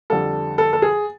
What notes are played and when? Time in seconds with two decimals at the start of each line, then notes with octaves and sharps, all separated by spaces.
0.10 F2 D3 G3 A4
0.58 A4
0.73 A4
0.82 G#4